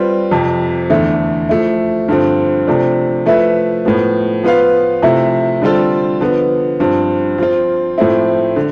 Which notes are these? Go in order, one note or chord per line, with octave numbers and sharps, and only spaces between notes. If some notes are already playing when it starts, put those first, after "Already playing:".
Already playing: G3 C4 F4 B4
F2 C3 F3
E2 D3 A3 E4
F3 A3 E4
G2 D3 F3 C4
C3 F3 A3 D4
F3 A3 E4 B4 E5
A2 F3 B3
F3 B3 F4 B4 F5
C3 F3 A3 E4
D3 G3 C4 F4 A4
D3 F3 B3
G2 F3 C4
F3 C4 F4
A2 F3 A3 C4 E4
D3